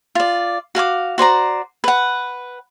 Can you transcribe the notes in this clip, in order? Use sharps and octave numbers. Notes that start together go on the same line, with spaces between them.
F4 D5
F#4 F5 G#5 D6
F#4 C5 D5 A#5
B4 F#5